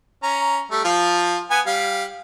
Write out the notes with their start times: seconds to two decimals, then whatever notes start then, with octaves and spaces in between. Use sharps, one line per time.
0.23 C#4 A#5
0.71 G3 A3
0.85 F3 F4
1.51 B3 G#5
1.66 G3 F5